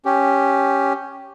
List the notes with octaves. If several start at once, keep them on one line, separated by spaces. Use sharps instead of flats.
C#4 G4